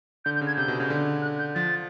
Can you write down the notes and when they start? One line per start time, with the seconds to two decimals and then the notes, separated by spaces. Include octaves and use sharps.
0.25 D3 G6
0.36 G6
0.41 C#3
0.47 G#6
0.57 C3 G6
0.68 B2
0.80 C#3
0.90 D3
1.22 F#6
1.39 G6
1.55 F3 A6